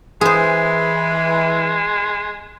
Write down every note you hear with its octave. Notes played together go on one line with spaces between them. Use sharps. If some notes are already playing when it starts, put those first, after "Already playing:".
E3 G#3 G#4 C5